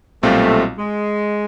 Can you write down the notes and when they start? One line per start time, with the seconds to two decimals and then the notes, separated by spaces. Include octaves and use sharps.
0.23 B1 A#2 G3 A3 C4 F4
0.78 G#3